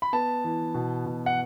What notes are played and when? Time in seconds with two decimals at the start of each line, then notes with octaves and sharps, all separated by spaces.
0.02 B5
0.13 B3 A5
0.44 E3
0.74 B2
1.06 B2
1.26 F#5